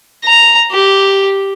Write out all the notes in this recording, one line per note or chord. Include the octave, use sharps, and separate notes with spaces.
A#5
G4